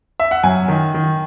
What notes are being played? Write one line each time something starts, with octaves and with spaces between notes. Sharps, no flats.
E5
F#5
F#2 G#5
D#3
D#3